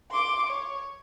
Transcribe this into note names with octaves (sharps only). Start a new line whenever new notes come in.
C6 D6
C#5